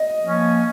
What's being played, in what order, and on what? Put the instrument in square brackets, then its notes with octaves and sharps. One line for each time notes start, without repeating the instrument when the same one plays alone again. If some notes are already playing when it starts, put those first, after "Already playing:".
Already playing: [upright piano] D#5
[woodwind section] F3 A#3 C#4